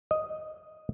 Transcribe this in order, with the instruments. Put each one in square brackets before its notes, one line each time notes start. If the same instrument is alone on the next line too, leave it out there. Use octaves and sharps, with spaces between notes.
[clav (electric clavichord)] D#5